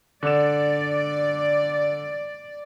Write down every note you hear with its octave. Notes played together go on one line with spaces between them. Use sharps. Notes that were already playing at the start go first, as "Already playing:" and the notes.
D3 D4 D5 E7